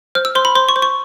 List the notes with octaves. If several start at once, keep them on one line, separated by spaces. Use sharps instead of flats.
C5 F6
E6
C5 C6
B5
C5 C6
C#6
C5
C#6